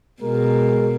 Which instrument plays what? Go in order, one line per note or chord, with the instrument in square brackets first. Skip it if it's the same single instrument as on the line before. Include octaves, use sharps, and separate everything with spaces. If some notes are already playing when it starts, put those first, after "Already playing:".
[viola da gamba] B2 [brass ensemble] G#3 A#4